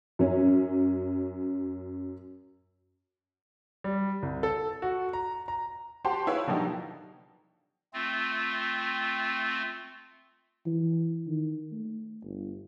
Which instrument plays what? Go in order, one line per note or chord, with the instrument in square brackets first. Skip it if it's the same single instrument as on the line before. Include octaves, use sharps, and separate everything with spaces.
[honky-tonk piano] F#2 C#4
[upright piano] G3
C2
A4
F#4
A#5
A#5
[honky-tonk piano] F#4 G4 C5 A5 C6
E4 F#4 G#4 B4 C#5 F5
A#2 D3 F3 F#3 D#4 G4
[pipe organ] A3 C4 F4
[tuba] E3
D#3
A3
G1